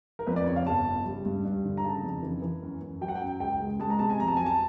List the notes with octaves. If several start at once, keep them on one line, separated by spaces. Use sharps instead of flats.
A#4
F2 B4
D5
C#3 C#5
F5
G1 A5
C#3
G3
G2
G2
D3
A#5
C#3 A5
F2
E3
E3
F#2
F#2
F#3 G5
F#5
G5
F#2
C#2 G5
G#3
G#3 A5
A#5
C3 A5
G#5
F2 A#5
A5
F#3 G#5
A5